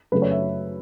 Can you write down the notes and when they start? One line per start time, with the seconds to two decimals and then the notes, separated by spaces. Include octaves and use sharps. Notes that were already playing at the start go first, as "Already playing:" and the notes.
0.12 F#2 C#3 F#3 A3 B4
0.22 C#5
0.31 E5